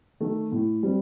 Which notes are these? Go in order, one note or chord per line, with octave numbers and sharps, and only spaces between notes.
D#3 A3
A2
G3 C4